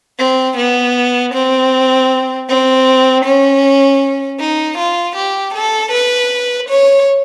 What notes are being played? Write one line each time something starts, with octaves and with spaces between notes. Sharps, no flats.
C4
B3
C4
C4
C#4
D#4
F4
G4
A4
B4
C#5